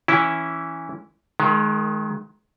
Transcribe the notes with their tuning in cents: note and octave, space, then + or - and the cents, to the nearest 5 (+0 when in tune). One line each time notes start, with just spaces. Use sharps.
E3 +0 C#4 +0 E4 +0
D#3 +0 G#3 +30